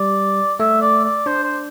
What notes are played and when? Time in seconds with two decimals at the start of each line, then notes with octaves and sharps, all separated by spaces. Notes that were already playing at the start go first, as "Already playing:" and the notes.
Already playing: G3 D5
0.60 A3 E5
0.81 D5
1.04 D5
1.26 D4 C5
1.43 C5